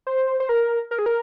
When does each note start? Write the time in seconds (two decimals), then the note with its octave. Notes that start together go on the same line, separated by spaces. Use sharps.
0.07 C5
0.40 C5
0.49 A#4
0.91 A#4
0.99 G#4
1.06 A#4